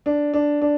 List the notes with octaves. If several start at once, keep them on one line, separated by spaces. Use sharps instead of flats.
D4
D4
D4